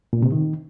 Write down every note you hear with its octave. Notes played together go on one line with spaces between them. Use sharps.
A#2
C3
D#3